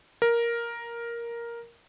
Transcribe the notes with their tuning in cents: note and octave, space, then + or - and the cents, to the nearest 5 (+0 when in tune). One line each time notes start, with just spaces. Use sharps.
A#4 +5